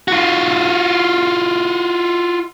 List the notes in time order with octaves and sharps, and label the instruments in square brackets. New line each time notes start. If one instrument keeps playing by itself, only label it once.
[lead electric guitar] F4 F#4